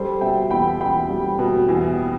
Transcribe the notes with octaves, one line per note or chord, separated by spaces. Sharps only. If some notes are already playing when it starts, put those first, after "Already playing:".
Already playing: G3 A4 C5
B2 E5 G5
E2 G5 B5
E2 G5 B5
G3
B2
E2